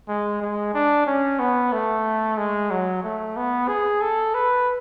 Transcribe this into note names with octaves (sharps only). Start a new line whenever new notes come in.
G#3
G#3
D4
C#4
B3
A3
G#3
F#3
A3
B3
G#4
A4
B4